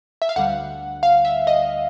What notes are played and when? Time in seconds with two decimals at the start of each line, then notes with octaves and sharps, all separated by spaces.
0.22 E5
0.29 F5
0.36 D2 D3 G3 F#5
1.03 F5
1.25 E5
1.47 D#5